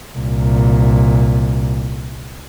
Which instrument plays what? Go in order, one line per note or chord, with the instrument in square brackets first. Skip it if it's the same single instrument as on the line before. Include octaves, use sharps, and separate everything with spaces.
[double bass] C2 A#2